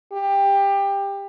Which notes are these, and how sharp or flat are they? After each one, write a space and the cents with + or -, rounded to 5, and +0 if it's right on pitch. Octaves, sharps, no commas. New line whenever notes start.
G4 +20